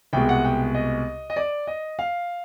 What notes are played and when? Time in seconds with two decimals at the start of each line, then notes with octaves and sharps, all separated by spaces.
0.13 C2 B2 G#3 G5
0.29 F#5
0.45 G5
0.75 D#5
1.30 D#5
1.36 D5
1.67 D#5
1.99 F5